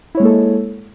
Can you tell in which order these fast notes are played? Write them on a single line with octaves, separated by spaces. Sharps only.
E4 C#5 G#3 A#3 A4